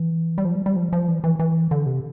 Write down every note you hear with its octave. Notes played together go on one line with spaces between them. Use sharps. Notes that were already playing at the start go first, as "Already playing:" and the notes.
Already playing: E3
G3
F3
G3
G3
F3
F3
E3
E3
E3
D3
C3